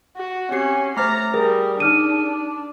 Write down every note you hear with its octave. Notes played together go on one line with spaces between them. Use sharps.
F#4
C4 C#4 G4 C7
A3 C5 A#5 D6 F6 A6
G3 G#4 A#4
D4 D#4 F6 D#7